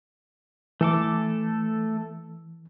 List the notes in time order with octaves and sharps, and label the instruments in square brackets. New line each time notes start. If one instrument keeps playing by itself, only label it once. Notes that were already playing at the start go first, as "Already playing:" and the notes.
[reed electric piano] E3 [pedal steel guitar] A3 A4 D6